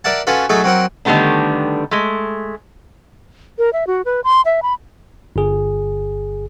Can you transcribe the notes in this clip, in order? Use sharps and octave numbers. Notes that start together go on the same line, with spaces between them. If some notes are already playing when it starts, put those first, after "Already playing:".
A#4 D5 E5 F#5 A5
C#4 F4 F#4 A4 B4
F#3 A3 D#4 G#4 A4 E5
F#3 C4 A#4 F#5
D3 D#3 G3 A3 B3 D4
G#3 A3
A#4
E5
F#4
B4
C6
E5
B5
G1 G#4